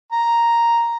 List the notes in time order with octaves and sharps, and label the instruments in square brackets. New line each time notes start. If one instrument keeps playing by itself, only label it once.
[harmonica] A#5